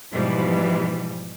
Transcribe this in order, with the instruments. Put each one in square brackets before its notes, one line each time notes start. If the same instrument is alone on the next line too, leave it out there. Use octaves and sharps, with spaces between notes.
[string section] G#2 B2 E3 F3 G3